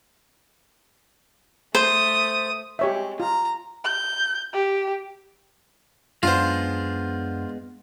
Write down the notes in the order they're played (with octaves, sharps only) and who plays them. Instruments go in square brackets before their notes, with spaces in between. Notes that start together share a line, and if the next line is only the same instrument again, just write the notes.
[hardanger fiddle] A3 D#6 [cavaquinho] C5
[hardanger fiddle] G#3 [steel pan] G4 C#5 E5
[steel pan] F4 [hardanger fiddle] A#5
[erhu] G6
G4
[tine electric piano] F#2 D4 F#5 [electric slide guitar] G#3 B3 [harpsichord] F4 C5